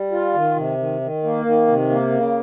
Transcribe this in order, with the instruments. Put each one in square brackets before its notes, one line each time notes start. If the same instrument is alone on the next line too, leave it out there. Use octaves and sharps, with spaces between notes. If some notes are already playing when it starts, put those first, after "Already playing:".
Already playing: [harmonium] G3
F4
D#3
C3
D#3
D#3
A#3
D#3
C3
A#3
C#3